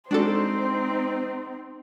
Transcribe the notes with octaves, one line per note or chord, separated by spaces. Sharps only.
G#3 C4 D4 D#4 F#4 A4 C5 D5